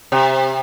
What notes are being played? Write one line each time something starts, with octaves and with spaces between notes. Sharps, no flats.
C3